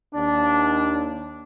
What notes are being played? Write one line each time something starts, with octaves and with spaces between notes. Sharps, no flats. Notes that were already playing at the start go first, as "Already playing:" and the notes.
D#2 D4